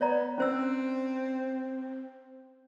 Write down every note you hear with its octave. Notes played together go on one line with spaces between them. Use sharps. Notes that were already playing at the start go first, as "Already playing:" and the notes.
B3 C#5 D5 A#5
C4 C#4 C5 E6